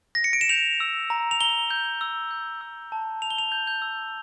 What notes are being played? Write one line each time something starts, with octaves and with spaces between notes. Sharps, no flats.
A#6
C#7
D7
E7
G6 F7
E6
A#5
F7
A#5 G7
G6
E6
G6
E6
A5
A5 F7
G7
F7
G6
G6
E6